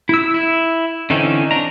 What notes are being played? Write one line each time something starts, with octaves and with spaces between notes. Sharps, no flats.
E4 E6
E4
D3 E3 C4 C#4 D#4
D4 A#5